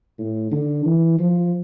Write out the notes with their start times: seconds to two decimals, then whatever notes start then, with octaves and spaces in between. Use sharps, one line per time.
0.18 A2
0.52 D3
0.86 E3
1.19 F3